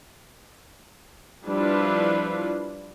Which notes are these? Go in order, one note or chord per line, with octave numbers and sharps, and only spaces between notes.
F3 G3 D4 E4 F4 B4